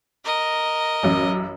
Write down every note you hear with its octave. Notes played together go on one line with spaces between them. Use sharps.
A#4 D#5
A1 F#2